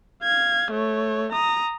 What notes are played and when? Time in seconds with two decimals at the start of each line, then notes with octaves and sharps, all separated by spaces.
0.23 F5 G#6
0.72 A3 C#5
1.32 A#5 D#6